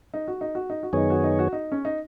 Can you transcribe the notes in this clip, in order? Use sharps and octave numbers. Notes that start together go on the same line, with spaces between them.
D#4
F#4
D#4
F#4
D#4
F#4
F#2 D#3 B3 D#4 G#4 C#5
F#4
D#4
F#4
D#4
C#4
D#4